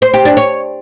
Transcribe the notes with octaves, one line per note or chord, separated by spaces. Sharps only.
C5
G4
D4
C#5